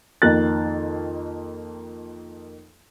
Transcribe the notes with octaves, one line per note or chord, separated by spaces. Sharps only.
F2 D#3 A#3 F#6 A6